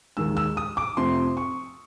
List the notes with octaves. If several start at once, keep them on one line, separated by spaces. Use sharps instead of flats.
D#2 D#3 G#3 E6
E6
D#6
D6
F2 C3 F3 A3 C6
C#6